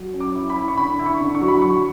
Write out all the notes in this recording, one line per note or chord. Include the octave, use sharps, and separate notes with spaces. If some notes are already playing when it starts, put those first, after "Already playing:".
Already playing: F#3
C#4
D6
E4
B5
E4
C#6
D3 B5
E4
C#6
D3
C#6
F#3
B5
F#3 C#6